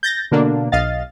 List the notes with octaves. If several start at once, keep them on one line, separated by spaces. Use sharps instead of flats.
G6 A6 A#6
B2 D3 A#3 D4
B1 D#5 F5 A6